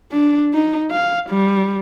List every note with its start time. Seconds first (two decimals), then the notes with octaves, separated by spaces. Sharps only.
0.12 D4
0.54 D#4
0.91 F5
1.29 G3